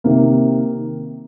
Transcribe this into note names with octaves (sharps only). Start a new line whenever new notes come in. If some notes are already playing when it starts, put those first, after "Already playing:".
C3 D#3 A#3